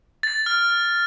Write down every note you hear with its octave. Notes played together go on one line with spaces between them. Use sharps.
A6
F6